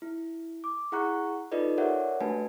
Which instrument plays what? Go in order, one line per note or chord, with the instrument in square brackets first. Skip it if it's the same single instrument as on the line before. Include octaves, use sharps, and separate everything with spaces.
[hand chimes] E4
D6
E4 G#4 F#5 A#5 C#6 F#6
D#4 F4 A4 B4 D5 D#5
G4 A#4 C#5 D5 E5 F#5
A3 D4 F#4 B4 G#5 A5